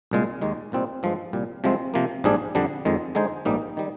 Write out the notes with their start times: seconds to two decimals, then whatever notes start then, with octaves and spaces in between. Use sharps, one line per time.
0.11 C2 A#2 G#3
0.41 D#2 D#3 G#3
0.72 C2 A#2 G3 C4 D#4
1.03 G2 F3 G#3
1.33 C2 A#2 G3
1.64 C2 C3 F3 G#3 C4
1.94 C3 F3 A#3
2.24 A#1 G#2 G3 D4 G#4
2.55 F2 D3 G3 D4
2.85 F2 D#3 G#3
3.15 D3 G#3 D#4 G#4 C5
3.45 A#1 G#2 G3 A#3 D#4
3.77 D#3 G3